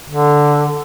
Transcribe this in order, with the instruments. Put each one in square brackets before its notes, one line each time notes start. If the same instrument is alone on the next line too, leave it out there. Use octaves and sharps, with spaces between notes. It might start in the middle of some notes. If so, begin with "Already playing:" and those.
[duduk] D3